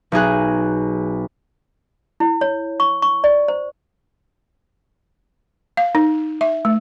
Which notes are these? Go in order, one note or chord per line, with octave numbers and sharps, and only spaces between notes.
B1 D#4 G#4 F#6
E4
C#5
C#6
C#6
D5
C5
F5
D#4
E5
A3